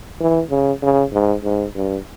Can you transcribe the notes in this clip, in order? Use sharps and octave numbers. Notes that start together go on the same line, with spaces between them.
E3
C#3
C#3
G#2
G#2
G2